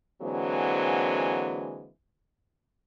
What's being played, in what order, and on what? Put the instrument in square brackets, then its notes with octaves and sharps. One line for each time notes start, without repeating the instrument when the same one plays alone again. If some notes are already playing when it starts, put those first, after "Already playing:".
[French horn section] D3 E3 F#3 G#3 A#3 C4